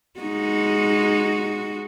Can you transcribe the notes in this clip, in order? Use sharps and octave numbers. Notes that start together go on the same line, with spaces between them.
G#3 D#4 F#4